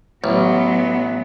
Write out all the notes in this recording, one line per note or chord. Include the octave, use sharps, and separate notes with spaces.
A1 F#3 B3